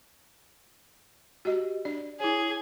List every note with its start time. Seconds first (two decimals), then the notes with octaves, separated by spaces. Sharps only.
1.45 F#4 G4 D#5
1.85 D4 D5
2.20 E4 G#4 C#5